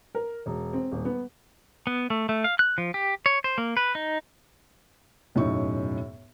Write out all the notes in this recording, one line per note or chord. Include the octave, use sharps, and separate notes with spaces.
A#4
E1
C4
D#1
B3
B3
A3
A3
F5
F#6
F3
G4
C#5
C5
A#3
B4
D#4
E1 F#2 A2 D#4 C#6